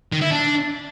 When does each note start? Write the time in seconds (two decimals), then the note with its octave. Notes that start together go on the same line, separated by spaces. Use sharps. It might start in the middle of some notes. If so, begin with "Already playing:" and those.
0.12 D#3
0.21 E4
0.31 D4